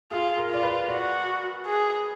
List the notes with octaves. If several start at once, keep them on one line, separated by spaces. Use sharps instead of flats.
F4 G#4
A#4
F4 D5
B4
F#4 D5
G#4